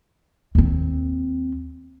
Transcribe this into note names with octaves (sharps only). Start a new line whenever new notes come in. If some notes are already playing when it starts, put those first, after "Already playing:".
D#2 C4